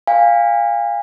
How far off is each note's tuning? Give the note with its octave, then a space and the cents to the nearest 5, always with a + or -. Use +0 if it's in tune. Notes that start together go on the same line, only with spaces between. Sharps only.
F5 +0 G#5 -35